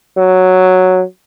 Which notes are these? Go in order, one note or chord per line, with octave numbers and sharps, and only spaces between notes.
F#3